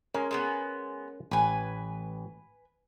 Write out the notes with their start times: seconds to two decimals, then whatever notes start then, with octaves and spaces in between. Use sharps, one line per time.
0.14 G#3 C#4 A#4
0.31 G#3 A#3 B3
1.31 A1 B4 G#5